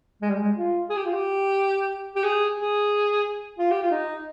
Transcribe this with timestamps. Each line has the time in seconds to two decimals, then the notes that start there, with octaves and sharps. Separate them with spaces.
0.22 G#3
0.30 G3
0.37 G#3
0.56 F4
0.90 G#4
0.97 G4
1.06 F4
1.13 G4
2.16 G4
2.24 G#4
2.57 G#4
3.59 F4
3.71 G4
3.82 F4
3.92 D#4